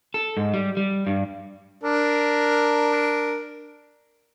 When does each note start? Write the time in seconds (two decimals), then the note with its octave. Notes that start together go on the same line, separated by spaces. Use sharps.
0.14 A4
0.37 G#2
0.54 G3
0.77 G3
1.07 G2
1.84 D4 A#4